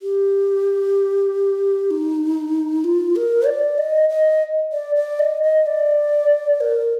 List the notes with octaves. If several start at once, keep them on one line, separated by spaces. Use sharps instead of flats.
G4
D#4
F4
A#4
D5
D#5
D#5
D5
D5
D#5
D#5
D5
A#4